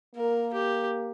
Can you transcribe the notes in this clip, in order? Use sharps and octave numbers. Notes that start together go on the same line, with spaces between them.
A#3 A#4
G4